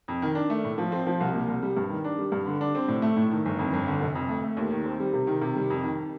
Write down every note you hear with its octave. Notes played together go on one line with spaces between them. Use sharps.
F2
D#3
D4
A3
A2
F3
C4
F3
C2
A#2
C2
G3
G2
D#3
D4
G3
G2
D3
D4
C4
A2
A3
A2
D#3
G1
F2
G1
D3
F1
F2
A3
A3
D#2
D#3
C4
G3
C3
D#3
C3
G3
F2
D#3